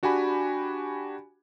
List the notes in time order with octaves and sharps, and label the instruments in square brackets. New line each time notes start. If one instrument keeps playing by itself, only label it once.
[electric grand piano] D4 F#4 G4 G#5 B5